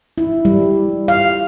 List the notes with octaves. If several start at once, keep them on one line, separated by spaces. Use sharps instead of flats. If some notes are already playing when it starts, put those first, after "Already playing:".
E4
G3
F5